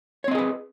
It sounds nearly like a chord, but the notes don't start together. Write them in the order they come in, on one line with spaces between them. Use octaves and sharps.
C#5 C4 D#5 G#4 B4